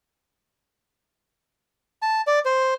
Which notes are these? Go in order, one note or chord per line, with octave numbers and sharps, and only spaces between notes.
A5
D5
C5